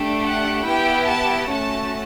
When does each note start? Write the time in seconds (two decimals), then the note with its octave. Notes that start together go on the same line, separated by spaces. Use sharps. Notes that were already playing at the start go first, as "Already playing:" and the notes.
Already playing: A3 D4 G4
0.23 F#5
0.65 B3 E4 G4 G5
1.07 A5
1.50 A3 C#4 F#4 A5